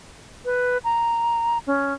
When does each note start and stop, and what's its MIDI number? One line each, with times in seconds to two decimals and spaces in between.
0.45 0.78 71
0.84 1.58 82
1.67 1.93 61